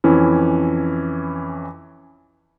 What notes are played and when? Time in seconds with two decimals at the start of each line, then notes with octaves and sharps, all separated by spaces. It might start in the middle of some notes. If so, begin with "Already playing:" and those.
0.04 F2 E3 C#4 E4